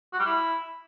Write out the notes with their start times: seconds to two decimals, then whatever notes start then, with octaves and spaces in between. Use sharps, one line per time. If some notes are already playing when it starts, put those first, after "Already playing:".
0.13 F#4
0.19 G3
0.25 E4